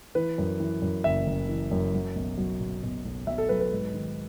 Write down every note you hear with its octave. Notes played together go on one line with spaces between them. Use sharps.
E3 B4
F#2
E3
F#2
F#1 E5
F#1
E3
F#2
F#3
B1
F#3
B2
B2
B1
B1 E5
A4
F#3 B4
B4
G#2
D#3